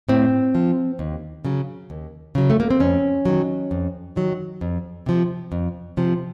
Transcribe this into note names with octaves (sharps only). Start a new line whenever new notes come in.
A2 C4
F3
D#2
C#3 F#3
D#2
C#3 F#3
A3
A#3
C4
F2 C#4
D#3 F#3
F2
D#3 F#3
F2
C3 F3
F2
C3 F3